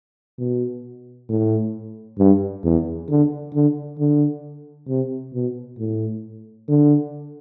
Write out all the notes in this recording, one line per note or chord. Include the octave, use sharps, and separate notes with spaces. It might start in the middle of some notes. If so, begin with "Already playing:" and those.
B2
A2
G2
E2
D3
D3
D3
C3
B2
A2
D3